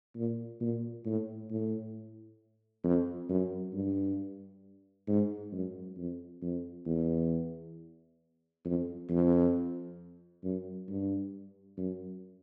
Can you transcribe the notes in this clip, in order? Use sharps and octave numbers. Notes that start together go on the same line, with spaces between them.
A#2
A#2
A2
A2
F2
F#2
G2
G#2
F#2
F2
F2
E2
F2
F2
F#2
G2
F#2